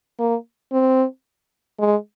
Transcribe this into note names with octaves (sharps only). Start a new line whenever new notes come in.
A#3
C4
G#3